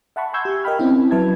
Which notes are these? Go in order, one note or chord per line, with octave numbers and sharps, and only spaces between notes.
E5 F#5 A5 B5 C#6
G#5 C6 C#6 E6 G6 G#6
G4
A#4 D#5 F5 G5 B5 F6
C4 C#4 E4 D#5
F#3 B4 E5 A5 G#6